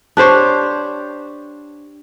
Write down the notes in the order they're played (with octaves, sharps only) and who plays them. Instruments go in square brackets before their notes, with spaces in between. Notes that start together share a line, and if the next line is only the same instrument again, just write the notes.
[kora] D4 G4 C5 C#5